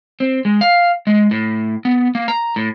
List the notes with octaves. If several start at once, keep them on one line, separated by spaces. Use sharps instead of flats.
C4
G#3
F5
G#3
A2
B3
A#3
A#5
A2